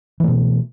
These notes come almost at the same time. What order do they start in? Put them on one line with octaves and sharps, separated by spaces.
E3 A3 B2